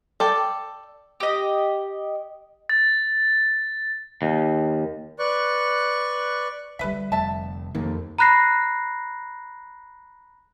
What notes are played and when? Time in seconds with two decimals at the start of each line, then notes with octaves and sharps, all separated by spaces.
0.20 A4 D5 G5
1.20 G4 D#5
2.69 A6
4.22 D#2
5.19 B4 D5 C#6 F#6
6.79 D3 G3 B4 E5
7.12 F1 E5 A5
7.75 F2 D#3 A#3
8.19 A#5 B5 F#6 A#6 C7